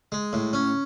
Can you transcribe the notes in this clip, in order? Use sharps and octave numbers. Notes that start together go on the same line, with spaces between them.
G#3
A2
C#4